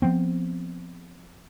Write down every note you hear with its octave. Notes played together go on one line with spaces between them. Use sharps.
F3 B3 C4